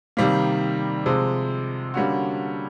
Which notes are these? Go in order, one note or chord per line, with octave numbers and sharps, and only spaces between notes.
C3 D#3 G3 A#3
C3 F3 G#3
D3 G3 A#3 C#4 F#4